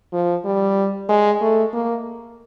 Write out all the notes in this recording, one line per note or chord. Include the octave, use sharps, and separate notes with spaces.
F3
G3
G#3
A3
A#3